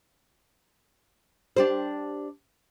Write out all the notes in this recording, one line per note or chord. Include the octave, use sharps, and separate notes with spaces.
D4 G4 C5